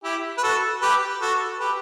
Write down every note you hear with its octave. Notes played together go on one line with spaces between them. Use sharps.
E4 G4
B4
F#4 A4
G4 B4
F#4 A4
G4 B4